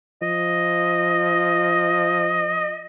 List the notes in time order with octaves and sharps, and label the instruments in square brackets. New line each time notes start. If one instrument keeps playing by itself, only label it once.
[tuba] F3 [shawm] D#5